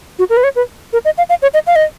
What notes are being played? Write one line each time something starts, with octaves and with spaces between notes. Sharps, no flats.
F#4
A#4
B4
C#5
B4
A#4
D#5
F5
F5
C#5
D#5
F5
D#5